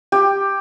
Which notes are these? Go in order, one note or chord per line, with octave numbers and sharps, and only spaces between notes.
G4